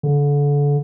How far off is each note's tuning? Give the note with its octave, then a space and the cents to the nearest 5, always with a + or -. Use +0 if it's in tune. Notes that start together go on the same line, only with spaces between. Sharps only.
D3 -30